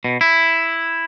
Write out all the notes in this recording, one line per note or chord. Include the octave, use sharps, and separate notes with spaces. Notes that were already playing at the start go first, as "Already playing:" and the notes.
B2
E4